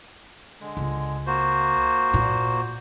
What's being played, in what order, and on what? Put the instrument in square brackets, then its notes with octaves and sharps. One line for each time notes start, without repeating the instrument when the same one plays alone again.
[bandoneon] D3 G#3
[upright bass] C#2
[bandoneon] A#3 F#4 C5
[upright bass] A#2